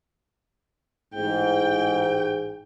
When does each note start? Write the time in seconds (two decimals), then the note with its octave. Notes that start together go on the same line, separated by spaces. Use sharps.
1.15 A1 G#2 G5